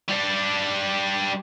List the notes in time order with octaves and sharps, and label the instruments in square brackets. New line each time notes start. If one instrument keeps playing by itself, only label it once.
[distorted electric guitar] G3 D4